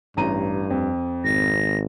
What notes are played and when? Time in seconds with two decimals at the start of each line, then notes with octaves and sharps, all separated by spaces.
0.17 A1 G2 A#5 D#7
0.70 F2
1.24 G#1 A#6